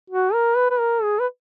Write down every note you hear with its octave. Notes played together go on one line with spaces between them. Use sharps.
F#4
A#4
B4
B4
A#4
G#4
B4